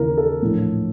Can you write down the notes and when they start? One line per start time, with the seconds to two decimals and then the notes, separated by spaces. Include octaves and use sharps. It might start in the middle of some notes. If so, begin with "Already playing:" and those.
Already playing: D#2 C#3 E3 A#4
0.17 A4
0.42 A#1 A2 E3